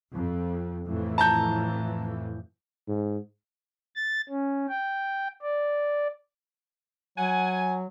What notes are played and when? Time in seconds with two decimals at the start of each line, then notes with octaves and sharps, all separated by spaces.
0.13 F2
0.85 F2 A2 E3
1.18 A5 A#5 G6
2.88 G#2
3.95 A6
4.29 C#4
4.69 G5
5.42 D5
7.18 F#3 F#5 G#5